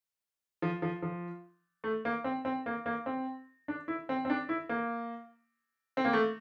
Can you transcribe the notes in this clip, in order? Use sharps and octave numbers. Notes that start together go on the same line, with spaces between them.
F3
F3
F3
A3
A#3
C4
C4
A#3
A#3
C4
D4
E4
C4
C4
D4
E4
A#3
C4
A#3
A3